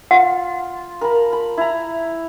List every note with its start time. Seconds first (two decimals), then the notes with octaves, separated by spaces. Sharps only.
0.11 F4 F#5
1.01 A#4 A5 B5
1.33 B5
1.58 E4 A#5